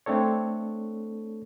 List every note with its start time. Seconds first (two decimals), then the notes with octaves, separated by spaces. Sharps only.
0.06 A3 C4 D4 A4 C#5